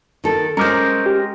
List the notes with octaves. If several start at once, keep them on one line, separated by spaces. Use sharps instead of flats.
D#3 A4
G#3 C#4 G#4 A#4 C5 A#5 D6
G4